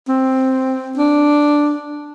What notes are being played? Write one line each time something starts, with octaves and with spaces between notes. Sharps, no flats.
C4
D4